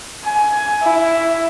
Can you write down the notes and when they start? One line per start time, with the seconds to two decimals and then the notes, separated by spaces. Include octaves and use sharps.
0.25 G#5
0.82 E4